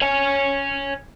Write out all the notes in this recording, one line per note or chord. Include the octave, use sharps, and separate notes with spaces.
C#5 G#5